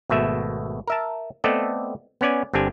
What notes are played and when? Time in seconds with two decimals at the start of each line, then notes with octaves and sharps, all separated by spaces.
0.10 G#1 B2 A3 E5
0.88 A#4 E5 A5
1.44 A3 B3 C4 A4 D5 D#5
2.21 B3 C#4 D5 G#5
2.53 G1 C4 D4 G4 G#5